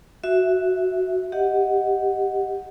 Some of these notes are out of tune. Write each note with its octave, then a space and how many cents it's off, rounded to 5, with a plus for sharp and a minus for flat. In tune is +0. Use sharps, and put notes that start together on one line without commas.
F#4 +0 E5 +0
G4 +0 D#5 +0 F#5 +0